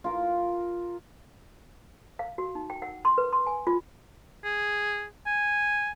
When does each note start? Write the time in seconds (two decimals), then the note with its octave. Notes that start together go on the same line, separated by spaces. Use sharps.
0.04 F4 A#4
2.19 F5
2.38 F#4
2.55 D#4
2.70 G5
2.82 F#5
3.05 C6
3.18 B4
3.33 C6
3.47 G#5
3.67 F4
4.44 G#4
5.26 G#5